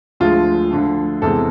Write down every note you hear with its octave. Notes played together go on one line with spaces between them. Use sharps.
D2 D3 F3 G#3 F4
D2 D3 F3
E2 C3 G#3 A4